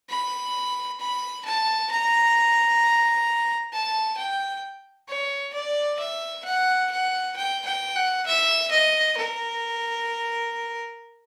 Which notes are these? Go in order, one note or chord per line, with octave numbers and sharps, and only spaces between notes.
B5
B5
A5
A#5
A5
G5
C#5
D5
E5
F#5
F#5
G5
G5
F#5
E5
D#5
A#4